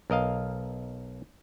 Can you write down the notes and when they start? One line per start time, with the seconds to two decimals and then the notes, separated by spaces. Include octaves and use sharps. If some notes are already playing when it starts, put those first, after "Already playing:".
0.10 B1 A#4 D#5 F5